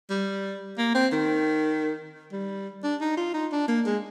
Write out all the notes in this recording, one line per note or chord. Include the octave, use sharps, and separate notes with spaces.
G3
A#3
C4
D#3
G3
D4
D#4
F4
D#4
D4
A#3
G#3